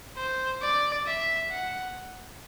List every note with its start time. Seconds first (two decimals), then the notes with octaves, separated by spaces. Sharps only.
0.17 C5
0.62 D5
1.07 E5
1.51 F#5